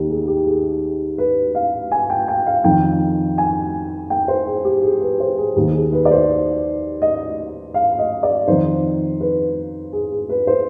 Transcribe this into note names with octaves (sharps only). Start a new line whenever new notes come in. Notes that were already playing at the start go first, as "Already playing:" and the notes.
Already playing: D#2 D#3 G4
G#4
G4
G#4
B4
F5
G#5
G5
G5
F5
F2 D#3 G5
G#5
G5
C5
G#4
G4
G#4
B4
C5
G#4
D#2 D#3 G4
G#4
B4
D5
C5
D#5
F5
D#5
D5
F2 D#3 C5
B4
G#4
G#4
B4
C5